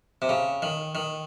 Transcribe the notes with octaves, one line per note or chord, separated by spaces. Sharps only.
C3
C#3
D#3
D#3